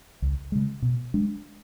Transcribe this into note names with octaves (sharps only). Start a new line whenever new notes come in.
C#2
C#3 G#3
B2
G#3 D4